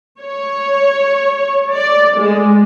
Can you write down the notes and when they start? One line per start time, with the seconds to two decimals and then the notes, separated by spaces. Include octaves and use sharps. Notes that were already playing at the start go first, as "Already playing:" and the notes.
0.21 C#5
1.73 D5
2.19 G#3